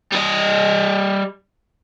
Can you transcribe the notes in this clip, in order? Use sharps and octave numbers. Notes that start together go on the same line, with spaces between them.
G3 D#5